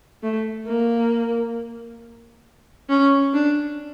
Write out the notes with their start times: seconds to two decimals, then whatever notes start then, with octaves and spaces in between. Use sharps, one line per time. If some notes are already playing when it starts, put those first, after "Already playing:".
0.23 A3
0.67 A#3
2.89 C#4
3.34 D4